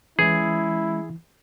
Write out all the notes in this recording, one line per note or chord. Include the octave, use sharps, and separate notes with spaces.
E3 G#3 C#4 E4 G#4